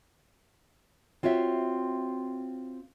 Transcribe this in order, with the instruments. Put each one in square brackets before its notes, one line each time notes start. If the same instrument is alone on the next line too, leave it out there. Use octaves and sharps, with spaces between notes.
[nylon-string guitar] C4 F4 F#4 C#5 E5